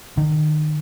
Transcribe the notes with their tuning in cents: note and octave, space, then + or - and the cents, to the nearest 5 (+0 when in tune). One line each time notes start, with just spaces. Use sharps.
D#3 -30